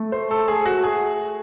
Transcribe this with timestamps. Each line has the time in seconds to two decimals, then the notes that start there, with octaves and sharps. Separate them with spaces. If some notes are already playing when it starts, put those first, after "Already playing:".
Already playing: A3
0.12 C5
0.31 A4
0.48 G#4
0.66 F#4
0.84 G#4